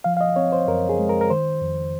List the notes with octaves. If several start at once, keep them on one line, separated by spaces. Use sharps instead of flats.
F3 F5
F5
D#5
C4 C#5
C5
F#2 A#4
G#4
G#3
A#4
A#4
D#3 C5
F2